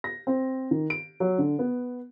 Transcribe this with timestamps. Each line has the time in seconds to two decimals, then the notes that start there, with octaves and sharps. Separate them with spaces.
0.04 A#6
0.27 C4
0.71 D#3
0.90 D7
1.20 F#3
1.38 D3
1.59 B3